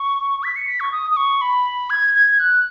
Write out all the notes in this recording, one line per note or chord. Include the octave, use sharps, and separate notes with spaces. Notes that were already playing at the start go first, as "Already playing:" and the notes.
Already playing: C#6
B6
C#7
B6
C#6
D#6
D#6
C#6
B5
G#6
G#6
F#6